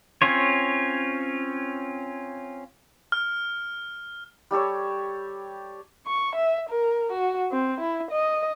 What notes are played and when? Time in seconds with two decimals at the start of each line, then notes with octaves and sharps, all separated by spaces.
0.22 C4 C#4 F4 C#5
3.12 F6
4.51 G3 G4 A4 C#5
6.07 C#6
6.36 E5
6.69 A#4
7.12 F#4
7.52 C4
7.81 E4
8.11 D#5